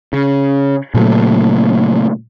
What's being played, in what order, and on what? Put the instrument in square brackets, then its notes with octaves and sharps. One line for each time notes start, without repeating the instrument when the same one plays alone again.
[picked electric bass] C#3
A#2 C#3 F#3 A3